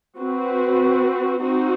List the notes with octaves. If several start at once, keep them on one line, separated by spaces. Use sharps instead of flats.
C4 F#4 B4
C4 D#4 F#4